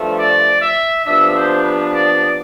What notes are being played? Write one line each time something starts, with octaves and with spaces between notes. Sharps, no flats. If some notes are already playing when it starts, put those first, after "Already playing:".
Already playing: G2 F3 A3
D5
E5
C3 F3 B3 D4 E5
C5
B4
D5